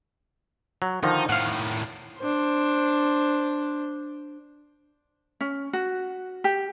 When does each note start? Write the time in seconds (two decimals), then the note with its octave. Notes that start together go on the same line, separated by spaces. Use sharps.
0.82 F#3
1.03 D3 D#3 F3 D#4
1.29 A2 D#3 F5 F#5
2.19 D4 C5
5.41 C#4
5.73 F#4
6.44 G4